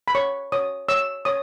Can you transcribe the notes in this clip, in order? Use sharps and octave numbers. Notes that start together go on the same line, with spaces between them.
B5
C#5 C#6
C#5 D#6
C#5 E6
C#5 D#6